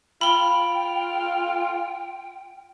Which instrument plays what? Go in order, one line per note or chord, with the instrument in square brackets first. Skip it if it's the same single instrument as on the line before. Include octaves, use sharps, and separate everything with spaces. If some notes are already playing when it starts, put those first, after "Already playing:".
[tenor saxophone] F4 [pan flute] G5 [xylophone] B5 G7